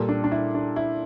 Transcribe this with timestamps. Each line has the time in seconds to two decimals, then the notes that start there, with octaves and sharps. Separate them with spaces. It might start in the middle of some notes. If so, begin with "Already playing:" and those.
Already playing: A#2 G3 A4
0.09 D4
0.24 D4
0.32 E4
0.55 D4
0.76 E4